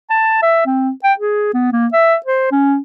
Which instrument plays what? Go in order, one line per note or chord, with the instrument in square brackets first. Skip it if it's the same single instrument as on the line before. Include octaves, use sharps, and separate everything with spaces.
[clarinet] A5
E5
C4
G5
G#4
B3
A#3
E5
C5
C#4